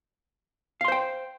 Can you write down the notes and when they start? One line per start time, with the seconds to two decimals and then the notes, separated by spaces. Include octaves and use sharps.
0.81 F5
0.85 C6
0.88 C5
0.92 G5